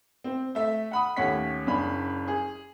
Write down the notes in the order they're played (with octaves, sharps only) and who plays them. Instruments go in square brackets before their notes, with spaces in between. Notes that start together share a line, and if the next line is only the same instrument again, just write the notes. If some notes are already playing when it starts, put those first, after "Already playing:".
[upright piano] C4
A3 E5
F#5 B5 D#6
D#2 A3 C#4 C#5 F#5 B6
F#1 C#4 D4 B5
G#4